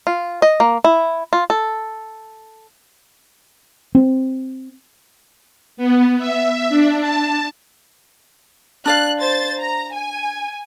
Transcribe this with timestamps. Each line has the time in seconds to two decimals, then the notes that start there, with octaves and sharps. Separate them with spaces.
0.07 F4
0.42 D#5
0.60 A#3
0.84 E4
1.33 F4
1.50 A4
3.95 C4
5.77 B3
6.18 E5
6.69 D4
7.00 A5
8.86 D4 D5 F5 F#6
9.20 C5 A6
9.59 A#5
9.93 G#5